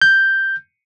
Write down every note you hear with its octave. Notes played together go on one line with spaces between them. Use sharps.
G6